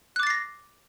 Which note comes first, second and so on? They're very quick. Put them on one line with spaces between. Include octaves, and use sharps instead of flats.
F#6 D6 A6 C7 A#6